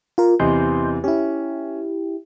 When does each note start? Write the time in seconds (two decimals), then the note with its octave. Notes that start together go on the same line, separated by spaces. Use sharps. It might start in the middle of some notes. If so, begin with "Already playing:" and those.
0.18 F4 A#4
0.40 E2 C3 E3 D#5 C6 G6
1.04 C#4 E4 G4